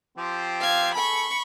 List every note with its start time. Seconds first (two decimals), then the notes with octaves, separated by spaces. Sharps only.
0.18 F3 C4 G4
0.60 F5 G#6
0.95 G#4 A4 B5 C#6